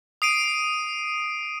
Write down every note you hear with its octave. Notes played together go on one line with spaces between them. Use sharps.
D#6 C7 D7 D#7